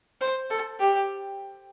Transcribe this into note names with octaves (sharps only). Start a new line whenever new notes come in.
C5
A4
G4